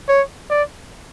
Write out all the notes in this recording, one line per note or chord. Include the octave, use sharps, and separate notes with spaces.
C#5
D5